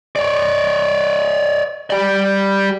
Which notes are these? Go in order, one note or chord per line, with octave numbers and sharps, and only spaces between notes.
C#5 D5
G4 D5